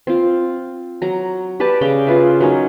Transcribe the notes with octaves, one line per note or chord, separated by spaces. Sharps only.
C4 F4
F#3 A#5
G4 B4 D5 A5
C#3 D5 G5 A#5
F4 B4 E5
F#3 A#3 C#4 D#4